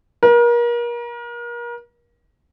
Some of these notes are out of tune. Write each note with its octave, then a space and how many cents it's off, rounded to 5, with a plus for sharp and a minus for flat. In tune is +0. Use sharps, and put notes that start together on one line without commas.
A#4 +35